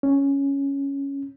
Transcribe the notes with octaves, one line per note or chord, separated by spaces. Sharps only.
C#4